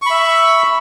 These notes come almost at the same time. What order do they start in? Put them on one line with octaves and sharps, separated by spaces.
C#6 B5 E5